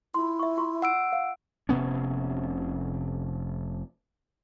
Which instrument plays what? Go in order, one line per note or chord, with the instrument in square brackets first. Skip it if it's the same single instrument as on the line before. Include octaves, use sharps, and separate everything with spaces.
[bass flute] E4 [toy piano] F4 C6
[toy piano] E5 C#6
F4 C6 C#6
[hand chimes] F#5 E6 D7
[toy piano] F5
[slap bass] F1 C3 B3 C#4